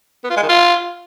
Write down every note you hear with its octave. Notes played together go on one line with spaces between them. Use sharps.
B3
F4
G#3
D#3
F4